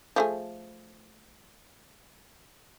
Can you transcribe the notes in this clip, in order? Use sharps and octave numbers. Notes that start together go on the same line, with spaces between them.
F3 A3 G#4